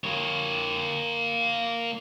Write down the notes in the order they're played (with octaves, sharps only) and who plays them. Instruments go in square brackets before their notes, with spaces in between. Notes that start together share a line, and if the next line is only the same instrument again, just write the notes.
[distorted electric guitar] A#3 C#5